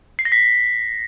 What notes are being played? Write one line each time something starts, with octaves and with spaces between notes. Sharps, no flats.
C7
A#6
B6